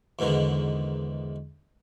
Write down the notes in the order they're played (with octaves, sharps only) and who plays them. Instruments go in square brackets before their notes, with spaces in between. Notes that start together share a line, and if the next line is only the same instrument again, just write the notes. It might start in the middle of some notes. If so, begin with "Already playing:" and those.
[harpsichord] E2 G#2 B2 D3 D#3